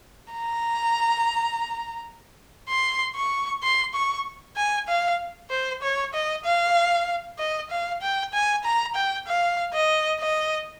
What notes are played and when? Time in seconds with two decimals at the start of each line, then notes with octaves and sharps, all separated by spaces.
0.33 A#5
2.69 C6
3.16 C#6
3.63 C6
3.94 C#6
4.57 G#5
4.88 F5
5.50 C5
5.82 C#5
6.14 D#5
6.45 F5
7.38 D#5
7.70 F5
8.02 G5
8.33 G#5
8.64 A#5
8.95 G5
9.27 F5
9.74 D#5
10.20 D#5